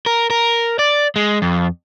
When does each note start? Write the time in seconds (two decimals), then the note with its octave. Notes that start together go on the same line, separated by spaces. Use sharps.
0.06 A#4
0.30 A#4
0.79 D5
1.16 G#3
1.42 F2